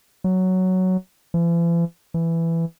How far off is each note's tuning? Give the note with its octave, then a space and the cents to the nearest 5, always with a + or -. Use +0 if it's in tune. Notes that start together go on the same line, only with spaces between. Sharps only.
F#3 +5
E3 +45
E3 +10